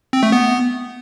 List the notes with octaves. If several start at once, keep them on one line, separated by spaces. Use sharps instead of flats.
C4
A3
B3